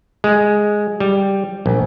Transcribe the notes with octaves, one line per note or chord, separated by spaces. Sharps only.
G#3
G3
A#1